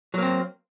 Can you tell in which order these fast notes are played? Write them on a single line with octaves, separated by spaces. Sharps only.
F#3 A#3 C4